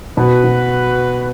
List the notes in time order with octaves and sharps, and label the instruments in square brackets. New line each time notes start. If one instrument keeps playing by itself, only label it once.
[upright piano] B2 [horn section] F#4 B4
[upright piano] B2